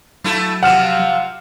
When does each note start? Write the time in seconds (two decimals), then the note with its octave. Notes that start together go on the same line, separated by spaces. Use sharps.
0.24 F#3 A3 E4 A4
0.63 C3 F3 F#5 F6 E7